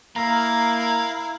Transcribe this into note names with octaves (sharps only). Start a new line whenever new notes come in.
A#3 E4 A#4 F5 A#5